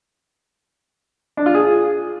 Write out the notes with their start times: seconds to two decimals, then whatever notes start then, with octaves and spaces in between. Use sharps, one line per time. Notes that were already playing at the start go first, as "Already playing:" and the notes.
1.37 D4
1.46 F4
1.55 G#4